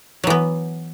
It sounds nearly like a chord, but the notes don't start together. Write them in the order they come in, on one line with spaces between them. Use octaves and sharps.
F#3 E3 B3